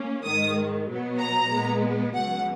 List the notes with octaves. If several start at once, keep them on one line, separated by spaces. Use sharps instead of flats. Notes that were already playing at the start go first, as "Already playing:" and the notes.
Already playing: A#3 C#4
G#2 D#3 G#3 D#6
B2 F#3 B3
A#5
A#2 G#3 B3
C#2 B2 F#3 F#5